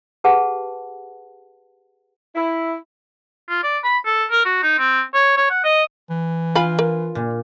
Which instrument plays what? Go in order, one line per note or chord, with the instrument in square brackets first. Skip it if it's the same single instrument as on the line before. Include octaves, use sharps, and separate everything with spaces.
[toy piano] G4 G#4 B4 F#5 A5
[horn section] E4
[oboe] F4
D5
B5
A4
A#4
F#4
D#4
C4
C#5
C#5
F#5
D#5
[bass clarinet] E3
[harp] F4 [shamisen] F5 G#5 B5
[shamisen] A#4
[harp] A#2